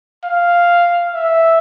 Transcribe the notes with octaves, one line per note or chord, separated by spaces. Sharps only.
F5
E5